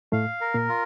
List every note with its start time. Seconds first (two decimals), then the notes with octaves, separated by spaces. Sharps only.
0.12 A2 A3 F5
0.41 A#4
0.54 A#2 A#3
0.69 F4